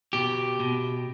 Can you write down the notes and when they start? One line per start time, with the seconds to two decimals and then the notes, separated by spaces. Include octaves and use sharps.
0.13 B2 G4
0.60 B2